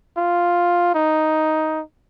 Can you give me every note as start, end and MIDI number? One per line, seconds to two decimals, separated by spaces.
0.17 0.92 65
0.95 1.82 63